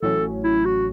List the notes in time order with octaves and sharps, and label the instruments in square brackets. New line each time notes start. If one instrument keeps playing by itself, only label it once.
[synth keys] A1 A2 F#3 C#4 [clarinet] A4
[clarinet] E4
F#4